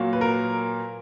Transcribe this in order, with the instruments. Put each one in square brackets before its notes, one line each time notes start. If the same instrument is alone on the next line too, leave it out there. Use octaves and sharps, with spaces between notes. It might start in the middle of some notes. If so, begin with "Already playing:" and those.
Already playing: [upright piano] A#2 F#3 A#3
B4
A#4